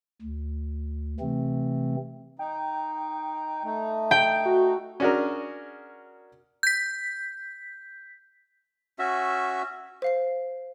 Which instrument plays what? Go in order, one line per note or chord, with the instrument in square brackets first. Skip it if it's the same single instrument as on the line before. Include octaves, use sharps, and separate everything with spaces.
[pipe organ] D2
C3 E3 A3 C4
[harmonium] D#4 [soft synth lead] G5
[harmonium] A3 D#4
[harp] G5
[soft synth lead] F#4
[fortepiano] C#4 D4 F#4 G#4 A#4
[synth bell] G6 B6
[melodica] C#4 F#4 E5
[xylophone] C5 F5 C7